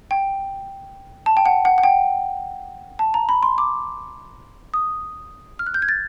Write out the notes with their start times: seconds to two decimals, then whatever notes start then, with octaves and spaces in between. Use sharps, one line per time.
0.11 G5
1.26 A5
1.37 G5
1.46 F#5
1.65 F#5
1.78 F#5
1.83 G5
2.99 A5
3.14 A#5
3.29 B5
3.43 C6
3.58 D6
4.74 D#6
5.59 F6
5.66 F#6
5.74 G6
5.82 G#6
5.89 A6